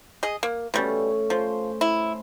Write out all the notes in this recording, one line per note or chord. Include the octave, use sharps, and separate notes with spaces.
G#4 D#5
A#3
B2 G3 A3 C#4
F3 C5
E4